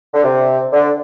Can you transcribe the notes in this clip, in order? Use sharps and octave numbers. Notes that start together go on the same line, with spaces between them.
D3
C3
D3